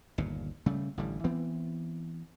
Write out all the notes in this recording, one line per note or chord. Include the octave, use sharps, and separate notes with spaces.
G1 D#2 A#2
C#3 G3 A3
A1 D3 G3
E3 B3 C4